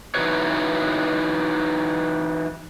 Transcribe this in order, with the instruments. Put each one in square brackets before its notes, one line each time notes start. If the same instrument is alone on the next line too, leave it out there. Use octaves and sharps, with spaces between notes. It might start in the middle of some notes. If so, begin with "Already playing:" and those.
[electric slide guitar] E3 G#3 D#4 F#4 B4 C#5